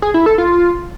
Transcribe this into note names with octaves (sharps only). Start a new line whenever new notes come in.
G#4
E4
A4
F4